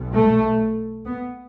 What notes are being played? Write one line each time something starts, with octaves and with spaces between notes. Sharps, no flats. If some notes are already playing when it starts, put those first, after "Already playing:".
Already playing: B1 B2
A3
B3